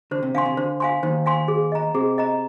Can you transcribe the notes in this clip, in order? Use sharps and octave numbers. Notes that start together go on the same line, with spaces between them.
D3 C5
C3
D3 F5 G#5 C6
C3
D3 C5
F5 G#5 C6
D#2 D#3 C5
F5 G#5 C6
G#4
D#5 A#5
C3 C4 G#4
D#5 A#5